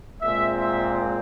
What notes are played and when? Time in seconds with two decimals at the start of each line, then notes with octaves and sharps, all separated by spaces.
0.22 A#2 G#3 C4 E5
0.60 E5